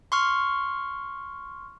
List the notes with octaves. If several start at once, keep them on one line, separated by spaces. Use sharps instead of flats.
C6 C#6 F6